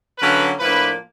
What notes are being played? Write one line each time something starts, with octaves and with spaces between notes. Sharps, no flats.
D3 F#3 A#3 C#4 B4
A2 F3 A#3 D4 B4